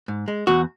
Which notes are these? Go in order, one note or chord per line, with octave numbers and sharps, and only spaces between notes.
G#2
G#3
E2 F#4